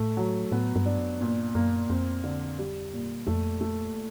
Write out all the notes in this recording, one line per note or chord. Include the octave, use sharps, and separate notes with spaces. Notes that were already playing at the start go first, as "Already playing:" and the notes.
Already playing: A2 A3
F#3
A2 B3
G2
D4
F#2
G2 A#2
F#2 A#3
F2 C4
D3
G3
A#2
F2 A3
A3